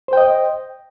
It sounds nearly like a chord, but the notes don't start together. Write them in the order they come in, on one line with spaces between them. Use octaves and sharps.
C5 G5 D#5